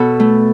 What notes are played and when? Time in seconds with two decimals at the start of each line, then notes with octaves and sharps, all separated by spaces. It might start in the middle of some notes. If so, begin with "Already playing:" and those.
Already playing: B2 A4 B4
0.20 A3